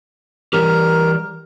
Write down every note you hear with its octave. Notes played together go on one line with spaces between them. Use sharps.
E3 G3 G4 A#4